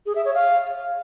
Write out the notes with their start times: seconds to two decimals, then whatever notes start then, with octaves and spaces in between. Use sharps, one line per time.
0.06 G#4
0.15 E5
0.25 C#5
0.34 F5